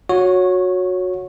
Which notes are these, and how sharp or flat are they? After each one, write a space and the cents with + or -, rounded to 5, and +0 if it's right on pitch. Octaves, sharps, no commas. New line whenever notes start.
F#4 -20 C#5 +0